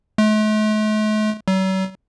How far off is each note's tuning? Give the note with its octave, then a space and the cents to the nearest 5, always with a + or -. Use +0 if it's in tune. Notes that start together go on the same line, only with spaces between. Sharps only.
A3 -45
F#3 +45